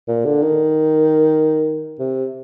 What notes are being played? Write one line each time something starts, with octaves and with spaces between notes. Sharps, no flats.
A#2
D3
D#3
C3